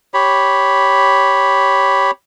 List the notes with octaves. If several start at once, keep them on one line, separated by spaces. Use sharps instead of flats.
G4 C#5 B5